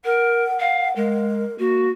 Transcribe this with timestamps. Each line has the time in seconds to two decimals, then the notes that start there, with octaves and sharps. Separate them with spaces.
0.05 A#4 F#5
0.60 F5
0.96 G#3 A#4
1.59 A#3 F#4